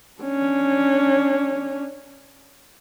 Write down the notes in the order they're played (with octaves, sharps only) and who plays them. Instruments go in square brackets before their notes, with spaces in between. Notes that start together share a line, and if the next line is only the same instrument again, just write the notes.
[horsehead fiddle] C#4 D4